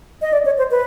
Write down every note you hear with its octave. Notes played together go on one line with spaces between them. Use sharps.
D#5
D5
C#5
C5
B4